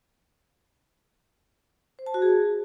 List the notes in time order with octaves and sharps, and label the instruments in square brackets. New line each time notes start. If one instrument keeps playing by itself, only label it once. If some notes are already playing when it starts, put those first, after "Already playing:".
[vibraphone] C5
A5
F#4
G#4